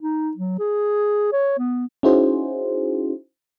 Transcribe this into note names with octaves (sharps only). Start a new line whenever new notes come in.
D#4
F#3
G#4
C#5
B3
C#4 D#4 E4 F#4 G#4 C5